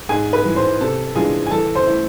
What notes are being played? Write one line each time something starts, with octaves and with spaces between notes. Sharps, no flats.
G#2 G#4 G#5
B4 B5
E3 G#3
C5 C6
C3 A4 A5
E3 G#3 D4 F4 G#4 G#5
G#5
E3 A4 A5
C5 C6
A3 E4